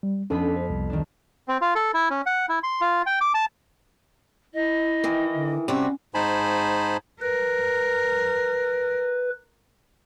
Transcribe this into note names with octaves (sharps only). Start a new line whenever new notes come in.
G3
F2 B3 C#4 D4 A4 B5
C5
C2
D#3 D4
C4
F4
A4
E4
C#4
F#5
E4
C6
F4
G5
D6
A5
E4 D#5
D#3 E3
D3
C3 G3 C#4 F#4
G#2 D#4 C5 G#5 A5 B5
A#4 B4